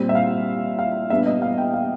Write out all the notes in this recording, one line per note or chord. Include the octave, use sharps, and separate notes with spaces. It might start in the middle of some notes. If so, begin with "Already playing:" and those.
Already playing: A#2 G3 C4
E5
F5
F5
A#2 G3 B3 D4 E5
D#5
F5
G5
F5